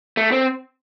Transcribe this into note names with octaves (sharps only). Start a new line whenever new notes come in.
A3
C4